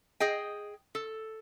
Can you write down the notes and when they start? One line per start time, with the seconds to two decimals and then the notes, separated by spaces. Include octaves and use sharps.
0.20 G#4 D#5 G5
0.95 A4